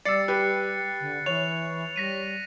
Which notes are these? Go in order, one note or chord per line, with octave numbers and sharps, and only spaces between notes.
G3 D5 E6 A6 C7 C#7
G4 B4 F#6
D3
E3 C#5 F7
G3 A#6 B6 D#7